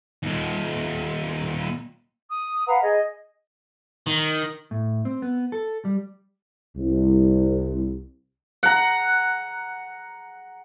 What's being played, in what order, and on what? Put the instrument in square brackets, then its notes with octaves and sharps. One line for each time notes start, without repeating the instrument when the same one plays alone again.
[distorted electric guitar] D#2 A#2
[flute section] D#6
B4 F5 F#5 A#5
G#4 D#5
[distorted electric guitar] D#3
[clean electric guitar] A2
C4
B3
A4
G3
[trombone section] C2
[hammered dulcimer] F#5 A#5